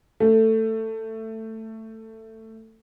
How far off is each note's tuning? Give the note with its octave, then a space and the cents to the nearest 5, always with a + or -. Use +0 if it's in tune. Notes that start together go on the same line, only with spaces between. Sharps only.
A3 +15